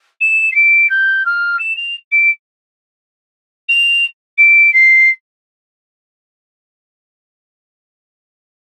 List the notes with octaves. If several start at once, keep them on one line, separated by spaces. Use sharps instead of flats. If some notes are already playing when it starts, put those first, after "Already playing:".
E7
C7
D7
G6
F6
E7
F7
D7
F7
D7
C7